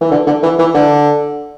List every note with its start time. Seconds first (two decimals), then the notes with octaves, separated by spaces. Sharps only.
0.01 E3
0.11 D3
0.27 D3
0.43 E3
0.59 E3
0.74 D3